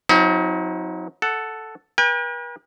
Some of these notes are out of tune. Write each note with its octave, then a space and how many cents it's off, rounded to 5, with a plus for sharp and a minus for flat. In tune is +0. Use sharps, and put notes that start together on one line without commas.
F#3 -30 C4 +0 D#4 +40
A4 +0 F#5 +0
B4 -45 G5 +45